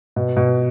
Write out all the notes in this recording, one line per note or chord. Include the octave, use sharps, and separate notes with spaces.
B2
B2